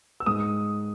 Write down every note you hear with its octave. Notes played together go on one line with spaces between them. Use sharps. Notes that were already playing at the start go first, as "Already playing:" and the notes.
E6
G#2 D#6